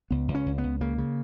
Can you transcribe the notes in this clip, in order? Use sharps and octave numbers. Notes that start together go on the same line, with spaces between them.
C#2 B3
C#2
C#4
C#2
B3
C#2
C#3 A#3
C#3